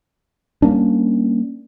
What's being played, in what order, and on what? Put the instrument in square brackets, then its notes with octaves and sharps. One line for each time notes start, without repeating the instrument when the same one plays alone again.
[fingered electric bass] G3 A#3 C#4 D4